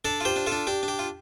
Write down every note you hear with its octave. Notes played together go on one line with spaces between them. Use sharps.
D4 A4 D5
F4 G4 C5
D4
F4 A4
D4
D4 G4
D4
G4
F4